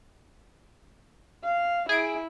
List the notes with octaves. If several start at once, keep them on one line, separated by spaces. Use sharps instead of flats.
F5
E4 G#4 D7